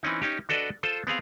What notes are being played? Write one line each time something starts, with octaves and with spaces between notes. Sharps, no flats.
E3 C4 C#4 D#4
C#4 D#4 G4
D4 F#4 A4 B4 D5 D#5
F4 A4 C5
B3 C4 G#4 F5